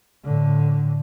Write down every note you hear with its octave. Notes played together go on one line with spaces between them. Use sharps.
A2 D3